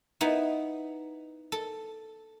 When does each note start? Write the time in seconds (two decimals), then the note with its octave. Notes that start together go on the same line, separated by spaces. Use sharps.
0.21 B3 D#4 E4
1.52 A4